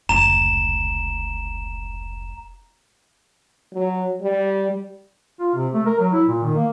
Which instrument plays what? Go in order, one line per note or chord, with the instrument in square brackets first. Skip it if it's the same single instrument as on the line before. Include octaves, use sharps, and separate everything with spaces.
[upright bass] F1 C#2 [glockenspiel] A#5 E7
[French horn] F#3
G3
[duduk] F4
C3
A3
A#4
F#3
E4
A#2
D#3
A#3